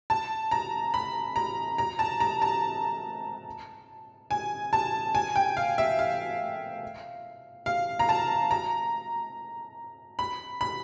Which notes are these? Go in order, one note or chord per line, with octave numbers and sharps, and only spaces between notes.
A5
A#5
B5
A#5
A#5
A5
A#5
A5
G#5
A5
G#5
G5
F5
E5
F5
F5
A#5
A5
A#5
B5
B5